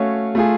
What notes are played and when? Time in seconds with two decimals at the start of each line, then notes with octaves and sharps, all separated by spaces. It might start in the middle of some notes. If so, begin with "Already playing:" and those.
Already playing: A3 C#4 F#4 C#5 F5
0.35 A3 F4 G#4